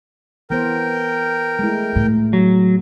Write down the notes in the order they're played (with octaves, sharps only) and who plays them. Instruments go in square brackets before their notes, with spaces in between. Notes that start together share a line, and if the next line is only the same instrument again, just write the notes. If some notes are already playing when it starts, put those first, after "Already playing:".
[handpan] E3 B3 C5 [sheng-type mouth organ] A#4 G5
[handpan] G#3 A3 E4
[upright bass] A2
[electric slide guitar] F#3